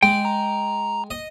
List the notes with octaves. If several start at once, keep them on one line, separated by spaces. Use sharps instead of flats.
G#3 G5
A#5
D#5